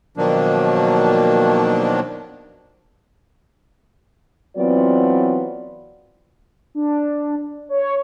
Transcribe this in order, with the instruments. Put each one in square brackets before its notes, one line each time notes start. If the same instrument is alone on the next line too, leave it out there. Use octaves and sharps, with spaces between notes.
[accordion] B2 D#3 F3 F#3 A#3 D4
[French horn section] E3 F#3 B3 C4 F4 D5
[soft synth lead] D4
C#5